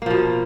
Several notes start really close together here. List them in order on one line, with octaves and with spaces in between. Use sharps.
A#3 F3 B2